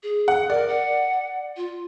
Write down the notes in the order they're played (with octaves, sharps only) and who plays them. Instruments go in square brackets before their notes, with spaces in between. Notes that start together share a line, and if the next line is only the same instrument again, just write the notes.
[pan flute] G#4
[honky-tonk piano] F#5
[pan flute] A#4 [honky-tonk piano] D5
[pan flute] F#5
F4